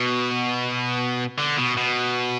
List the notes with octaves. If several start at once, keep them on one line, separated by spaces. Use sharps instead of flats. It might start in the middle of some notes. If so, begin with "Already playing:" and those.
Already playing: B2
D3
B2
B2